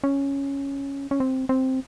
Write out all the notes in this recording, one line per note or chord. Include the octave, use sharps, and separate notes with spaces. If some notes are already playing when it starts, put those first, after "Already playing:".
C#4
C#4
C4
C4